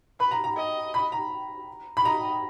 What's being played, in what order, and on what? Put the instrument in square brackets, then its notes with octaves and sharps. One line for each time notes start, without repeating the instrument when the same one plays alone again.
[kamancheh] B4 [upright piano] B5
[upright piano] A#5
A#5
[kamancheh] D#5
[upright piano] B5
A#5
B5
[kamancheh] D#5 [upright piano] A#5